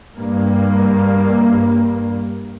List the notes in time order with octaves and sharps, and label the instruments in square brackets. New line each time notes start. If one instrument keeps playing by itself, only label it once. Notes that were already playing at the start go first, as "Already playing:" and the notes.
[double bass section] G2 A#3